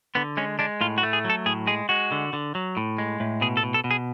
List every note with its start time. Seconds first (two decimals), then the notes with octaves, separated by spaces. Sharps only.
0.15 D3 B3
0.37 G#3 C#4
0.59 G#3 D4
0.81 A2 F4
0.98 F#4
1.03 A3
1.13 G#4
1.25 F#3
1.30 A4
1.46 A2 G#4
1.67 G#3 G#4
1.89 G#3 F#4
2.12 D3
2.33 D3
2.55 F#3
2.77 A2
2.98 G#3
3.20 A2
3.41 B2 G#4
3.57 A4
3.63 B2
3.74 A4
3.84 B2
3.91 G#4